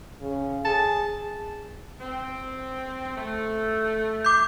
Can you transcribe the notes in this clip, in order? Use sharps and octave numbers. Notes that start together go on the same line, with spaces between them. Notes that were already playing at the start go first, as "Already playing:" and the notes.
C#3
G#4 A5
C4
A3
D6 G6